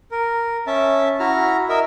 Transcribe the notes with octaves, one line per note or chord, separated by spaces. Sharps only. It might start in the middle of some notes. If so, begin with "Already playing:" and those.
A#4
C#4 E5 A5
E4 F#4 A#5 F6
A#4 D#5 E5 E6